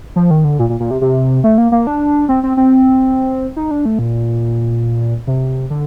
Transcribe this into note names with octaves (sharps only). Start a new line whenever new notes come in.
F3
D#3
D3
A#2
A#2
A#2
C3
C3
A3
A#3
A#3
D4
C4
C4
C4
D#4
D4
A3
A#2
C3
D3